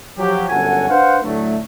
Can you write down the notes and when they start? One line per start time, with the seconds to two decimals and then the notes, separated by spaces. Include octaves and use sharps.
0.17 F3 F#3 G4
0.49 G1 F#2 F#4 A4 F#5 G#5
0.88 D4 B4 C5 F5 F#5
1.23 A2 D3 F#3 A3